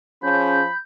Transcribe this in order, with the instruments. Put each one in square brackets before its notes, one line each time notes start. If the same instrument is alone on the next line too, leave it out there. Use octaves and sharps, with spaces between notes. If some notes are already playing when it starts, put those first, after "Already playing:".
[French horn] F3 [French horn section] C#4 G#4 [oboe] B5 [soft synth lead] G6